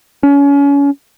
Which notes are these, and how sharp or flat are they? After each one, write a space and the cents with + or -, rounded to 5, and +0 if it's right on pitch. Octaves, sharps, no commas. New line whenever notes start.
C#4 +30